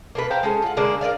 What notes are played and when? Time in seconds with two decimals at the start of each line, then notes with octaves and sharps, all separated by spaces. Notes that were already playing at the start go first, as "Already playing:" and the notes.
0.15 A#3 A4 B4
0.30 C5 F5 G5 A#5
0.43 G#3 C#4 A4
0.62 F4 F#5
0.77 D3 G#3 A#3 D4
1.01 A#4 B4 D5 F5